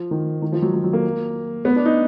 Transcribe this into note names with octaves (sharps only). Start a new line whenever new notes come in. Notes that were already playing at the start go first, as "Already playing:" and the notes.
Already playing: F3
D#3
D#3
F3
F#3
F#3
F#3
A#3
B3
D4
D#4